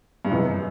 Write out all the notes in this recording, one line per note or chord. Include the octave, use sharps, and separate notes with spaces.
G2
F#2 C3 E3 G#3 B3